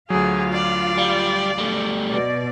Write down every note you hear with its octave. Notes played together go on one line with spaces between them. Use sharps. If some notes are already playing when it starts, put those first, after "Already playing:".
D2 F#3 F4 G#4 F5
D5
G3
G3 A3
B2 D5